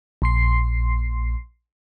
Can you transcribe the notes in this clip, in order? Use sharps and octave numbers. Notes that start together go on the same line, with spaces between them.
A#1 C6 C7